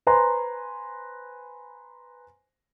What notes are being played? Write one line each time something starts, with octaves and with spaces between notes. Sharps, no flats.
B4 C5 G#5 A#5 C6